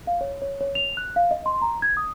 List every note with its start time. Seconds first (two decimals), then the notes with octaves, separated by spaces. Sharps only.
0.07 F5
0.21 C#5
0.42 C#5
0.61 C#5
0.75 F7
0.97 F#6
1.16 F5
1.31 D#5
1.46 C6
1.62 A#5
1.82 G#6
1.97 D#6